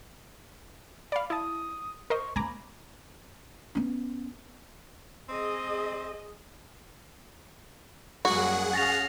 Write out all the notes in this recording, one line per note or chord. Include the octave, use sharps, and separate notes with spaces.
D5 F5 B5
E4 A5 D#6
A#4 C5 D#5 C#6
A#3 B3 G#5 A#5 B5 D6
B3 C#4
C4 G#4 D#5
F#2 G3 A#3 F#4 G#4 F#5
C#4 F5 A6 A#6 F7